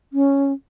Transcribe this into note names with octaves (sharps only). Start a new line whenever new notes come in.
C#4